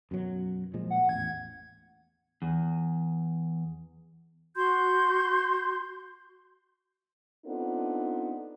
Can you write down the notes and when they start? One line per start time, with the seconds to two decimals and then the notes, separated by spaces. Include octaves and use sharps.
0.11 F#2 B2 F#3
0.74 A#2 F3 G#3
0.90 F#5
1.09 A1 E2 G#6
2.42 E2
4.56 F#4 C6 G6
7.46 B3 C4 D4 D#4 F4 A4